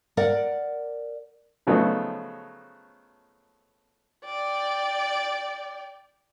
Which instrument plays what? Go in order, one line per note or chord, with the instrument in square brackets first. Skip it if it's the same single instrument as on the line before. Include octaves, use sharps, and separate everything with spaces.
[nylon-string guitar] A#4 D5 F#5
[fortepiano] C#3 F3 F#3 A3 B3 D#4
[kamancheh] D5 G5